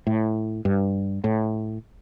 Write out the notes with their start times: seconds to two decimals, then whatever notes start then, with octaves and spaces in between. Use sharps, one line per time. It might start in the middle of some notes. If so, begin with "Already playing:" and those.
0.07 A2
0.65 G2
1.24 A2